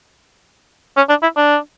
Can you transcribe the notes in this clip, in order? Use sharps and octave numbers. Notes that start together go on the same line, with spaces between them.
C#4
D4
E4
D4